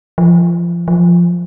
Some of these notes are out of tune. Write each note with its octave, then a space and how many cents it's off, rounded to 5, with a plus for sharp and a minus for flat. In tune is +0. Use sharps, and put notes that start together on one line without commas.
F3 -25
F3 +0